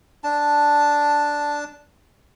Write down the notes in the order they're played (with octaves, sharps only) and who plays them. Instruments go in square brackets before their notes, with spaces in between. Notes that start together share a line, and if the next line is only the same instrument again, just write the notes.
[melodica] D4 A5